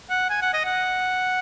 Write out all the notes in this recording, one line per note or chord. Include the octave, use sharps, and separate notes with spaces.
F#5
G#5
F#5
D#5
F#5